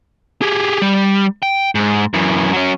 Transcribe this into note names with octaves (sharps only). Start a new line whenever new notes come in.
G4 G#4
G3
G5
G#2
F#2 E3
F#3 C#4